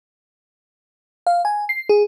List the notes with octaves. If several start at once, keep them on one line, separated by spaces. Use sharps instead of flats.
F5
G#5
C7
G#4